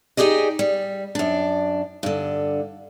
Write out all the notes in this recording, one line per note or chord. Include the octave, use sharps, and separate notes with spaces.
D#4 G4 G#4 D5 D#5
G3
F#2 D4
G2 D3